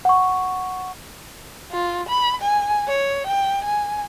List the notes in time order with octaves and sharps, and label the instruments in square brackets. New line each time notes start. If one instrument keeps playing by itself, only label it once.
[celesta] F#5 C#6
[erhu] F4
B5
G#5
C#5
G5
G#5